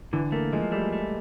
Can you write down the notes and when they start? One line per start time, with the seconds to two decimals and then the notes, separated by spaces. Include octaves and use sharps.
0.13 D3 E3
0.32 A3 A#3
0.52 F3 G#3
0.72 G3 A3
0.93 A3